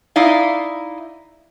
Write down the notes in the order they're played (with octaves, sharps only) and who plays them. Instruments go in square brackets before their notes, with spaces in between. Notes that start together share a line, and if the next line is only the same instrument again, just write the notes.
[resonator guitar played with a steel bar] D#4 E4 D5 F5